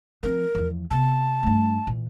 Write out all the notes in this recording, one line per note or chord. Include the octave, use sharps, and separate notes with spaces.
F3 C4 A#4
E2 F3
C3 B3 A5
G2 A3
A#2 E3